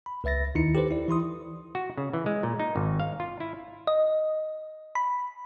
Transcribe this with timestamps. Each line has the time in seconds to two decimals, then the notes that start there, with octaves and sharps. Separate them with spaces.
0.06 B5
0.24 C#2 B4 E5 A6 A#6
0.55 D#2 D#3 D#4 E4 C#7
0.75 G4 A4 B4 C5
0.91 E4 D5
1.08 E3 E4 C6 D#6
1.75 F#4
1.98 C#3
2.13 E3
2.26 G#3
2.43 A#2
2.60 D#4
2.76 G#1
3.00 F5
3.20 F4
3.40 E4
3.87 D#5
4.95 B5